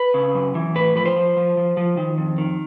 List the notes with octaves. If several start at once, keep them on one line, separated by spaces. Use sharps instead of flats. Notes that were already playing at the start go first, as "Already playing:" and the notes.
Already playing: B4
C#3
F#2
E3
A2 B4
F3 B4
C5
F3
F3
F3
F3
D#3
F2
D#3